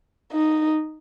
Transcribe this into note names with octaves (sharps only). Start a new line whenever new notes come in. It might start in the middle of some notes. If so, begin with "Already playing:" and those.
D#4